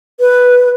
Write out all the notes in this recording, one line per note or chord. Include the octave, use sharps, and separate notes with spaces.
B4